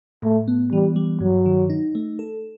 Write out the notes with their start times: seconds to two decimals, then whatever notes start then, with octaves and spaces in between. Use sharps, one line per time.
0.23 A2 A3
0.48 B3
0.72 E3 G3
0.96 G3
1.21 G2 F#3
1.46 D#3
1.70 D#4
1.95 A3
2.19 A4